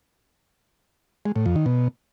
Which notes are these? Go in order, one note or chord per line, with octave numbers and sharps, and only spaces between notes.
G#3
A2
F2
D#3
B2